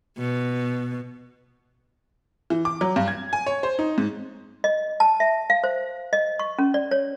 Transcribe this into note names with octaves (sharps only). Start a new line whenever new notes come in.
B2
E3
D6
F#3
G2
G#6
G#5
C#5
C5
D#4
G#2
D#5
A5
E5
F5
C5
D#5
C#6
C#4
D5
C#5